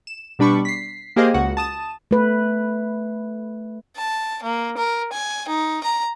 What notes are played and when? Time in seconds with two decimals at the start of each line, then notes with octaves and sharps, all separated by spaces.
0.07 E7
0.39 B2 G3 D4 B5 C#6 D6
0.65 B6 C7
1.16 A#3 G4 G#4 C5 D#5 F5
1.34 C#2 F#4 F#5
1.57 A5 D#6 E7
2.11 A3 B4
3.97 A5
4.43 A#3
4.78 A#4
5.13 G#5
5.48 D#4
5.84 A#5